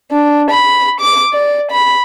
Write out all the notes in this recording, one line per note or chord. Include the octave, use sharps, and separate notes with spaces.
D4
B5
D6
D5
B5